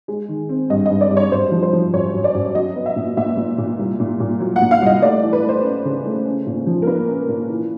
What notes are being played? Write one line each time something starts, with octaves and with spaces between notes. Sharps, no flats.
G#3
D#3
C4
G2 D#5
G2 D#5
D5
G2
C#5
F#2 C5
F3
C5
F3
F#2 C#5
F#2
D5
F#2
F#3 D#5
B3
E5
A#2
A#2 E5
A#2
A#2
C2
A#2
A#2
F#3
F#5
A#2
F5
C2 D#5
A3 D5
E3
B4
A3
C5
C#4
C#3
A3
C#4
A#2
F3
A#4
A#3 B4
C#4
A#2
E3